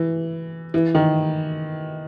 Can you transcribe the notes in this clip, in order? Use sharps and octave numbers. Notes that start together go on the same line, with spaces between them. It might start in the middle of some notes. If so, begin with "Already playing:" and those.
Already playing: E3
E3
D#3